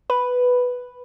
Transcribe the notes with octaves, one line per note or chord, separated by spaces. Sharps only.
B4